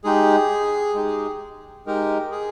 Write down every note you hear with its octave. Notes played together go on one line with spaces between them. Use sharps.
G#3 D#4 G4 G#4
G#3 D#4 G4
G#3 D#4 G4 A#4
G#4